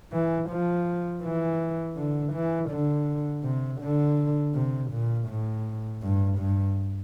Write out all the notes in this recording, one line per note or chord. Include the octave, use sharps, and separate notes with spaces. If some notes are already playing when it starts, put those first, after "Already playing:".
E3
F3
E3
D3
E3
D3
C3
D3
C3
A#2
A2
G2
G2